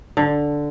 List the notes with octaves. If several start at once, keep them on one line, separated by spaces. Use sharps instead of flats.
D3